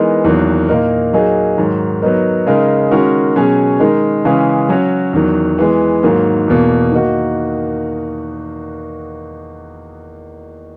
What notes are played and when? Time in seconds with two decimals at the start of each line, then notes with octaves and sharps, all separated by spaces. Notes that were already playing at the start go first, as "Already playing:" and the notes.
Already playing: E3 G#3 B3 D#4 A#4
0.24 E2 D#3 F#3 A#3
0.68 A#2 A#3 D#4 A#4
1.13 F#3 A#3 D#4 G#4
1.58 G#2 D#3 F#3
2.01 F#3 B3 D#4 A#4
2.46 C#3 G#3 D#4 A#4
2.91 D#3 G#3 C#4 F#4 A#4
3.35 B2 F#3 C#4 G#4
3.80 D#3 G#3 D#4 A#4
4.25 C#3 E3 G#3 C#4
4.69 F#3 C#4 F#4
5.13 E2 D#3 F#3
5.58 E3 G#3 B3
6.03 G#2 D#3 F#3 A#3
6.48 E2 B2 A#3
6.92 D#3 A#3 D#4 F#4